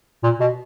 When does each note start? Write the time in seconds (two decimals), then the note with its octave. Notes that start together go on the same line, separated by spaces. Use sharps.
0.23 A#2
0.40 B2